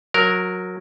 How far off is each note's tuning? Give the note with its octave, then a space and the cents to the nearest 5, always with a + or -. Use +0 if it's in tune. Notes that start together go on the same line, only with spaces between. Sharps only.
F#3 -15 A#4 +0